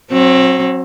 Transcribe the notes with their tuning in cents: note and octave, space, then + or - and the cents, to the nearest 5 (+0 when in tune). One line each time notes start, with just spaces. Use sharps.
F#3 -10 C4 +25